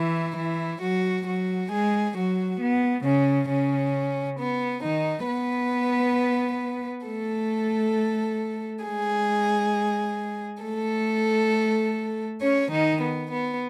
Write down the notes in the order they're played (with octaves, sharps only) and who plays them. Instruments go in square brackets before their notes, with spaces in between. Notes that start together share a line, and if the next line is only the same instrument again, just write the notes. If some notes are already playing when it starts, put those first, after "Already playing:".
Already playing: [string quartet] E3 E4
E3 E4
F#3 F#4
F#3 F#4
G#3 G#4
F#3 F#4
B3
C#3 C#4
C#3 C#4
B3
D#3 D#4
B3 B4
A3 A4
G#3 G#4
A3 A4
C#4 C#5
D#3 D#4
B3
B3